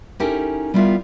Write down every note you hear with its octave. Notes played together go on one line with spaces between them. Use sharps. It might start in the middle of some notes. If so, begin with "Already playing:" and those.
C#4 D#4 E4 G4 A4 A#4
G3 B3 E4 F4 A#4 E5